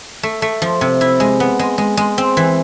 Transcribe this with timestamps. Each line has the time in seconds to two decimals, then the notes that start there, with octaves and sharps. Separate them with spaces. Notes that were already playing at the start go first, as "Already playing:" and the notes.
0.23 A3
0.42 A3
0.62 F3
0.81 C3
1.01 E4
1.20 G#3
1.40 B3
1.59 G#3
1.78 G#3
1.97 G#3
2.18 C4
2.37 E3